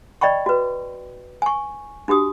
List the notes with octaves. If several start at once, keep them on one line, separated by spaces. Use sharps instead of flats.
D5 D#5 G5 B5 C#6
F#4 B4
G#5 C#6
D4 F#4 G4 D#6